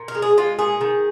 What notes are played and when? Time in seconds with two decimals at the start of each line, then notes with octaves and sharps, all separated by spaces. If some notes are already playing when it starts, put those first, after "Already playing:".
Already playing: A#2
0.08 A#4
0.15 G#3
0.22 G#4
0.37 G#3 F4
0.59 A#2 G#4
0.81 D#3